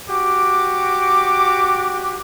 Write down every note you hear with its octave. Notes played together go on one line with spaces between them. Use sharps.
F#4 G4 D6